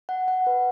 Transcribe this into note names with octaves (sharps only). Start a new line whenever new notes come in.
F#5
F#5
B4